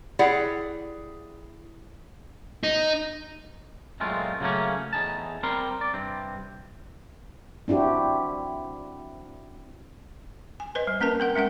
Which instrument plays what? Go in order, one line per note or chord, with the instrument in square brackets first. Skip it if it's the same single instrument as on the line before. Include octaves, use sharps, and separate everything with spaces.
[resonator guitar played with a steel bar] E4 G4 G#4 D5 F#5
[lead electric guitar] D#4
[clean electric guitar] F#2 A#2 G#3 A3 C4 F4
C#3 F#3 G3 A3 A#3 C#4
E2 A2 D#4 G#4 A5
G3 C4 A#4 C6
D5
G2 C3 C4
[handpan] C4 D4 E4 F#4 G4
[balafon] G#5
B4 C5 D#5
G3
A#3 C#4 A#4 B4 A5
C4 A#4 F#5
G#3 C#4 A#4 F#5